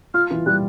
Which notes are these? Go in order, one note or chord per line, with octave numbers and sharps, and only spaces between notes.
F4 F6
E3
G3 F#6